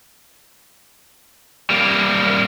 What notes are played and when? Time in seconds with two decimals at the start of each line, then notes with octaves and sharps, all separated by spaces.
1.70 G3 A#3